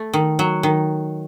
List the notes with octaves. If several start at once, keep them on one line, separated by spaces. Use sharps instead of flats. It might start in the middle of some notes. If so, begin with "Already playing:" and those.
Already playing: A3
D#3
F#3
D#3